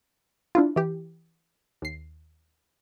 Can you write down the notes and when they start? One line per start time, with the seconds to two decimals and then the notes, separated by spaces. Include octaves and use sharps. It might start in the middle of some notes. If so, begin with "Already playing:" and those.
0.55 D4 E4 F4
0.76 E3 G4
1.82 D#2 C7